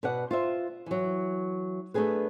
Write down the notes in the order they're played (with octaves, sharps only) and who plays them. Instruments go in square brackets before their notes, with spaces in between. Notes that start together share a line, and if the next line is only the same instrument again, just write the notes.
[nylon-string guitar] B2 B4 D5 F#5
F4 C5 E5
E3 F#3
A3 B3 D4 G#4 B4